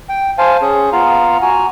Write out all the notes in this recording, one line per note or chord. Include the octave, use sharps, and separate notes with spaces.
G5
C5 F5 G#5 A5
C#4 G#4
B3 F4 F5 A#5
F#4 G#5 A#5